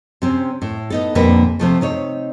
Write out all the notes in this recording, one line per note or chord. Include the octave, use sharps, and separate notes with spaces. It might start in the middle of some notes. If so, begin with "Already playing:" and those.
C3 C4 C#4
A2
B3 D#4 A4
F2 A#2 D3 G3 A#3 B4
C3 F3 A3
C3 D#4 C#5